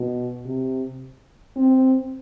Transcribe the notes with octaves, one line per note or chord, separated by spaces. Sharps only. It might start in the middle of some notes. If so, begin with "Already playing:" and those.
Already playing: B2
C3
C4